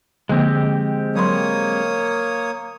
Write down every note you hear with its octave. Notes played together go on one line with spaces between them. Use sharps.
D3 F3 G#3 A#3 C4 G4
F#3 A#3 C#5 B5 C6 D#6